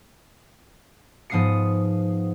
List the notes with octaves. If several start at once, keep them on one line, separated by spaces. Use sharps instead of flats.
G#2 F3 B3 D#6 C7 C#7